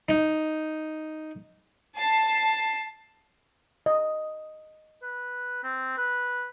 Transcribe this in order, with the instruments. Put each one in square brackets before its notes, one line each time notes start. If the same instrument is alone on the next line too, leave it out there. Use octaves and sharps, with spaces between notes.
[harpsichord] D#4
[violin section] A5 C7
[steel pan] D#5
[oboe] B4
C4
B4